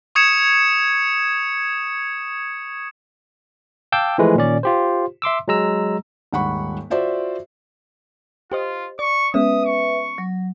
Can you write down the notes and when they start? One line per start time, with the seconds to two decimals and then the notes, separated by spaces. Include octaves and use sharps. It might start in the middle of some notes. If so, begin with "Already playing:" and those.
0.15 C#6 D#6 G#6 C#7 E7
3.92 F5 G5 A5 D6 E6 G6
4.18 E3 F3 G#3 A3 B4
4.35 A#2 D#3 C#4 D5
4.63 F4 G4 C5
5.22 E5 C6 D6 E6
5.48 F#3 G#3 A#5 E6
6.33 D#1 G#2 F#5 B5 C#6
6.90 F4 F#4 C5 D5 E5
8.52 F4 G4 C5 D#5
8.99 D5 C#6
9.34 G#3 B3 C#4 B4 E5 D#6
9.66 C#6
10.18 F#3